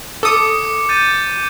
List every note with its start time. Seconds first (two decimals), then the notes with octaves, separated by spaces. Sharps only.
0.23 A4 D6 D#6 C#7
0.89 G6 A6 D#7